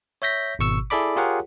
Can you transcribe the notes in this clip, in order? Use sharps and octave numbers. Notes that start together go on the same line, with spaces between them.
C#5 E5 G6 A#6 B6
G#1 B2 C#6 E6
E4 G#4 A4 D5 B5 D6
F4 G4 G#4 A#4 C#5 F#5